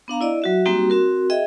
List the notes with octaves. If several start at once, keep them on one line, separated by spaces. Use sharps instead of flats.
B3 D4 F5 A#5
E4 D5 D#5
F#3 F#4 E5
G3 A#3 C4 D#4 F#4 G4
C4 F#4 A#4
G#4 D#5 E5 G5